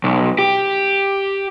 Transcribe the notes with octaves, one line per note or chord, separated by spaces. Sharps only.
B1
G4